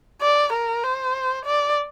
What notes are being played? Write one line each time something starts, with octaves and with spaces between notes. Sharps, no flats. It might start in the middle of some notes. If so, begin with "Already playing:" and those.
D5
A#4
C5
D5